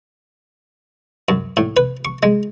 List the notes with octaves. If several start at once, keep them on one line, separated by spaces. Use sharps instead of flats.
F#2
A2
B4
C#6
G#3